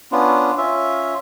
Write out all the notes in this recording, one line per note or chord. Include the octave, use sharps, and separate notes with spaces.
B3 C#4 D4 F4
C#4 F4 E5